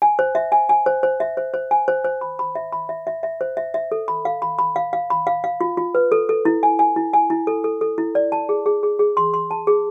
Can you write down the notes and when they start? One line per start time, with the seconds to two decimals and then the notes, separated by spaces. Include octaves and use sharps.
0.02 G#5
0.19 C5
0.35 E5
0.52 G#5
0.69 G#5
0.86 C5
1.03 C5
1.20 E5
1.37 C5
1.54 C5
1.71 G#5
1.88 C5
2.05 C5
2.21 B5
2.39 B5
2.55 E5
2.73 B5
2.89 E5
3.07 E5
3.23 E5
3.41 C5
3.57 E5
3.74 E5
3.92 A4
4.08 B5
4.25 F5
4.42 B5
4.59 B5
4.76 F5
4.93 F5
5.10 B5
5.27 F5
5.44 F5
5.61 F4
5.77 F4
5.95 B4
6.12 A4
6.29 A4
6.45 E4
6.63 G#5
6.79 G#5
6.96 E4
7.13 G#5
7.30 E4
7.47 A4
7.64 A4
7.81 A4
7.98 E4
8.15 D5
8.32 A5
8.49 G#4
8.66 G#4
8.83 G#4
8.99 G#4
9.17 C6
9.34 C6
9.51 A5
9.67 G#4